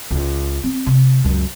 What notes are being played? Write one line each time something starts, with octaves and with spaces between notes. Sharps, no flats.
C#2
C4
C3
C#2 F#2